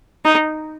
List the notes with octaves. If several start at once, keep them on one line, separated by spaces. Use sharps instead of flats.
D#4